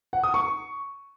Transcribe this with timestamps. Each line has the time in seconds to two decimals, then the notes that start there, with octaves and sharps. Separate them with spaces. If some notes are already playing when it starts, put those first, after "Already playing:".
0.13 F#5
0.23 D#6
0.34 C#6